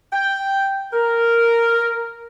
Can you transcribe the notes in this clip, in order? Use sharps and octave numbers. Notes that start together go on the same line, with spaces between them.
G5
A#4